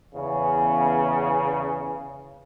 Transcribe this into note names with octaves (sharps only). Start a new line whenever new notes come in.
E2 C#3